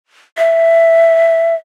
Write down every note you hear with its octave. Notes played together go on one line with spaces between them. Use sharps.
E5